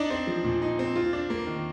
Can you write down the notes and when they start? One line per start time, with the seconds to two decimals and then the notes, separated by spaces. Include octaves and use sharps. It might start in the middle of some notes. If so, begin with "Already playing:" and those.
Already playing: D4 D#4 D5
0.10 C4
0.27 F3
0.44 A#2
0.62 D#4
0.79 C4
0.96 F4
1.13 D4
1.30 A#3
1.47 D#3